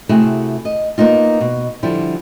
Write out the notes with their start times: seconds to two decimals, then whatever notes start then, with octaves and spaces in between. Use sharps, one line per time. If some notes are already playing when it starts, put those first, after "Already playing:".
0.09 C3 A3 E4 F#4 G#4
0.65 D#5
0.98 A#3 B3 D#4 F4
1.41 B2
1.83 D3 F3 G3 E4